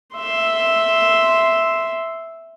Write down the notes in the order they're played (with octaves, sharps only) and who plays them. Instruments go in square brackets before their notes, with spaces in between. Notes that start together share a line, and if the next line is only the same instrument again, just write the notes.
[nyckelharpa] E5 C6